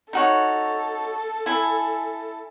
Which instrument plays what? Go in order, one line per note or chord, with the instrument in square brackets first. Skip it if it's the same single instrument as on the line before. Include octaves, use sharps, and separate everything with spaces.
[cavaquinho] D#4 F#4 C#5 [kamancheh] A4
[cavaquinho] E4 G#5